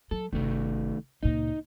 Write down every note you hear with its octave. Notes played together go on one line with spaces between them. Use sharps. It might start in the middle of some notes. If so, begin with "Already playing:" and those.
F#3 A4
G1 C3 D#3 A3
C#2 A#2 D#4